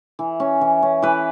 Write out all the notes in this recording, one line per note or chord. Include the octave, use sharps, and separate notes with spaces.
E3
C#4
E3
C#4
E3 B4